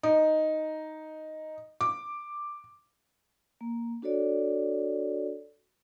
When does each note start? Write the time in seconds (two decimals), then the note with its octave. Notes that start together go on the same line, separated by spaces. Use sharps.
0.03 D#4
1.81 D6
3.61 A#3
4.02 D4 F#4 A4 C#5 D5